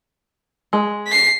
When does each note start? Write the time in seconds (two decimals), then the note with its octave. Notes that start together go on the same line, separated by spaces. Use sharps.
0.73 G#3
1.07 B6 C7